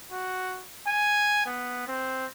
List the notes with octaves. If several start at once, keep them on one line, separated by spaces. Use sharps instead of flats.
F#4
G#5
B3
C4